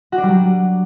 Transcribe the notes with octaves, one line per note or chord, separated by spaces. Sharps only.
F#4
D4
G3
F#3